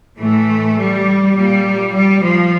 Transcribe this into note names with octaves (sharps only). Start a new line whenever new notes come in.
A2 E3 A3
G3
A#2 G3
G3
F3